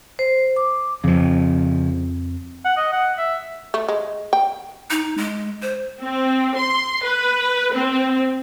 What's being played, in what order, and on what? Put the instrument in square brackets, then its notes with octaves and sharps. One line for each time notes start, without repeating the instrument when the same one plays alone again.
[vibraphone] C5
D6
[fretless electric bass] F2 [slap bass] C#3 F3
[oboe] F#5
D#5
F#5
E5
[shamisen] A3
G#3
G5
[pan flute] D#4
G#3
C5
[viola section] C4
C6
B4
C4